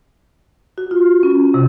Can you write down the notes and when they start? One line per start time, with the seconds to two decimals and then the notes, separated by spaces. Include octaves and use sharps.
0.78 F#4
0.91 F4
1.23 C#4
1.54 C3